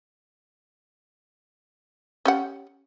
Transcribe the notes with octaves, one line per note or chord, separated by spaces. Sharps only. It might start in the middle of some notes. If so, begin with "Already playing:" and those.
C#4 G4 F#5